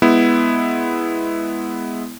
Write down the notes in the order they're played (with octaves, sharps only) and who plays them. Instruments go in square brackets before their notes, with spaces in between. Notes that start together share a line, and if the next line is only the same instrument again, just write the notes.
[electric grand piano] G#3 B3 E4